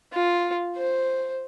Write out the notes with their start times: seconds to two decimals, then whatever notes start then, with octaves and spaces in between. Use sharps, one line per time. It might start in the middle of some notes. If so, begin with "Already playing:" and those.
0.14 F4
0.76 C5